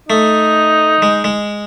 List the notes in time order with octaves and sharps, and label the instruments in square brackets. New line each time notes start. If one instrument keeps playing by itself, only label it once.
[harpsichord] A3 [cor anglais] D#4
[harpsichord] G#3
G#3